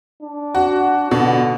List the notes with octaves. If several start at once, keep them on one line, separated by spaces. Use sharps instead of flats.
D4
F#4
B2 D3